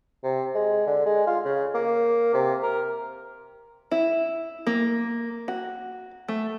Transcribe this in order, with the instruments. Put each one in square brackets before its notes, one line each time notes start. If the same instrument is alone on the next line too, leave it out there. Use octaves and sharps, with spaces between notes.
[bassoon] C3
G#3
D3
G#3
F4
C#3
A#3
C3
A#4
[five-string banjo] E4
A#3
F#4
A3